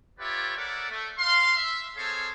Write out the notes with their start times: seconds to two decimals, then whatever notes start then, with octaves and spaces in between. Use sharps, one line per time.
0.20 F4 G4 B4 C#5 D5 E5
0.55 A4 A#4 C#5 D5 E5 F#5
0.90 A3
1.18 F5 C6
1.56 E5
1.97 C4 G#4 A4 C#5 F5 A5